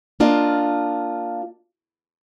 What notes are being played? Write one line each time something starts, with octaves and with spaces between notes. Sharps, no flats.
A#3 D4 F4 D#5